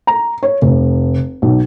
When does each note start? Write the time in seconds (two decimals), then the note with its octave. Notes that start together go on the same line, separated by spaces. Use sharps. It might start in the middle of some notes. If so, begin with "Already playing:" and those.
0.07 A#5
0.43 C#5
0.62 F1
1.42 B1